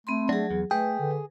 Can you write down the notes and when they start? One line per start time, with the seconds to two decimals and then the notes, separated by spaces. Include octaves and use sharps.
0.07 A3 C4 B5 C6
0.29 F#3 D4 G#4
0.51 E2
0.71 A3 G#4 B4 G5
0.99 D3